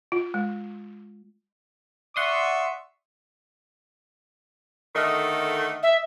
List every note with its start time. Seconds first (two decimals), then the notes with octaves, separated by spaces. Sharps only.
0.12 F4
0.34 G#3
2.16 D5 E5 F#5 C6 C#6 D#6
4.96 D3 D#3 A3 D#5 D#6 F6
5.83 E5